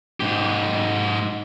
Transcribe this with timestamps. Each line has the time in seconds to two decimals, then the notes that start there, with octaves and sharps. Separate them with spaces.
0.20 G#2 G4